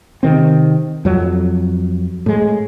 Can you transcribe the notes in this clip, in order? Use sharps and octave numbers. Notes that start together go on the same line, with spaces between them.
C3 D#3 C4
F2 F#3
A2 G#3